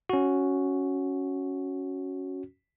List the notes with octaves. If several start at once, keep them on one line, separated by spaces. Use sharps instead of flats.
C#4 F#4